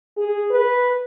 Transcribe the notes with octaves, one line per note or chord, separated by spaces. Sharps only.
G#4
B4